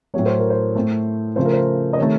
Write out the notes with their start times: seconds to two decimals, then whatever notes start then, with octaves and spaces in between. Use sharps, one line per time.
0.14 A2 F#3 A3 C#5
0.26 C5
0.39 A#4
0.50 C5
0.75 A2 A3
1.36 C#3 F3 A3 C5
1.45 A#4
1.53 C5
1.93 D#5
1.97 C3 D#3 A3 C#5